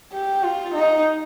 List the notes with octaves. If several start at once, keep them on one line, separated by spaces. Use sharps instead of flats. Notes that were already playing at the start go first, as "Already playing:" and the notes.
G4
F4
D#4